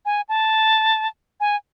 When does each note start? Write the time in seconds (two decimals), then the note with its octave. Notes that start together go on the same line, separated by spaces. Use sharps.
0.05 G#5
0.29 A5
1.40 G#5